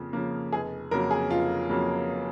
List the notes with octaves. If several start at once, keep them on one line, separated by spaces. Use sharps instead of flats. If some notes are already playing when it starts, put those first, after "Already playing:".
Already playing: F2 C#3 F3 A#3
C#3 F3 A#3
F1 G#4
F2 C#3 F#3 A#3 A#4
G#4
F1 F4
F2 C#3 F#3 A#3